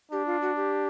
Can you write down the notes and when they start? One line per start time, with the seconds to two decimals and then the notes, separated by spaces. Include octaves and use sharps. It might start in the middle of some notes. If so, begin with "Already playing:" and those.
0.12 D4 G4
0.27 F4
0.42 F#4
0.56 G4